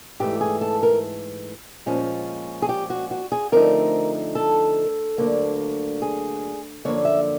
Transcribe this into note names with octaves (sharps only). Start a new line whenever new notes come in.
G#2 E3 A3 G4
G#4
A4
A#4
A#2 F3 G#3 C#4
G#4
G4
F#4
F#4
G#4
D3 F3 A3 C4 D#4 A#4
A4
D2 D3 F#3 A#3
G#4
F#2 D3 F3 A#3 C#5
E5